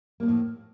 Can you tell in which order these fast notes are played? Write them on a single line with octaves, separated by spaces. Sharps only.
A#3 D3 F3 A2